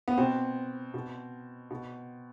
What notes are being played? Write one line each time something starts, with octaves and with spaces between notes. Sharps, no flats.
B3
B2 C4
B2
B2